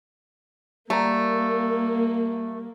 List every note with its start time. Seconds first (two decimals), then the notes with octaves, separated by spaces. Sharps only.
0.90 G3 A3 A#3 A#5